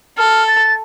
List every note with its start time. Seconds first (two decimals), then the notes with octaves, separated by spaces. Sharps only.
0.18 A4 F6
0.48 A6